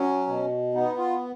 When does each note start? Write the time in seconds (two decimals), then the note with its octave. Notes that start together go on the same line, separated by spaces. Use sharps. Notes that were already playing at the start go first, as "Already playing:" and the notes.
Already playing: F#3 C#4
0.27 B2
0.74 B3 D#4
0.98 F4